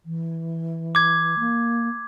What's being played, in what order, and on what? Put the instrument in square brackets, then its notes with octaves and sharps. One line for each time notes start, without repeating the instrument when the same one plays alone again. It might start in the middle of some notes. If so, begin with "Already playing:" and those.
[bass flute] E3
[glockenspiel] D6 G#6
[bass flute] A#3